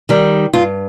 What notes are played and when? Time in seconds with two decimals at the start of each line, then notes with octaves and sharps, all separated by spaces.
0.09 D#3 G3
0.53 G2 F4